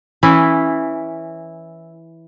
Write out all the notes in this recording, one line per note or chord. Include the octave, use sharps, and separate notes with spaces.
E3 C#4 E4